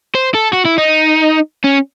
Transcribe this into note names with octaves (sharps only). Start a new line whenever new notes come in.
C5
A4
F#4
E4
D#4
C#4